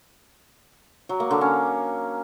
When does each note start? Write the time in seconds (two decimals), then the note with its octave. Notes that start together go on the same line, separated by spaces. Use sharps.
1.09 F#3
1.20 A#3
1.31 D3
1.41 C#4